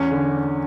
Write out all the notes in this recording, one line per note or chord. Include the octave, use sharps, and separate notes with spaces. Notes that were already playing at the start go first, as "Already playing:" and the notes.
Already playing: E2 C#4
D3